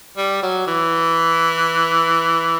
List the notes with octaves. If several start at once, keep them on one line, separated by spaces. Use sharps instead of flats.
G3
F#3
E3